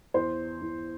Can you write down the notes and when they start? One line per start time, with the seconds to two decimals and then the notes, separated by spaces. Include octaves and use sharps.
0.14 E2 C5
0.61 E2